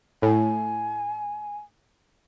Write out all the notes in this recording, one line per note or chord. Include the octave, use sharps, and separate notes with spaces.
A2 G#5